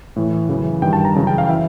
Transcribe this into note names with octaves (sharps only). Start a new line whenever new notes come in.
A2 E3
F#2 C#3 E3
G2 D#3 G5
A5
A#5
F#2 C#3 E3
G5
F5
E3 E5